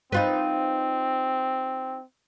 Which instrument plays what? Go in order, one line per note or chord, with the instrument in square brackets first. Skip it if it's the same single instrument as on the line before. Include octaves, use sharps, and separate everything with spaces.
[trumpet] C4 [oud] D#4 F4 B4